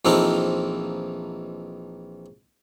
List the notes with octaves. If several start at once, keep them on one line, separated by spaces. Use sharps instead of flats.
A#1 E3 C4 D#4 F4 A4